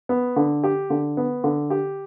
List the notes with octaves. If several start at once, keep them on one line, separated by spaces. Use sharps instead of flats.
B3
D3
G4
D3
B3
D3
G4